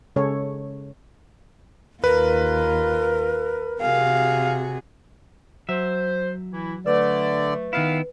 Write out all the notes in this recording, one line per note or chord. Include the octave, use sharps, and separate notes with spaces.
C#3 G#3 C#4 A4 C#5
D#2 F4 A#4 B4
C3 F#4 G#4 F5
F#3 C5 E5
E3 E4
D3 A3 B4 D5
D#3 B3 E4 F5